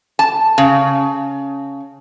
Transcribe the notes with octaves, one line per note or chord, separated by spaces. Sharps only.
A5
C#3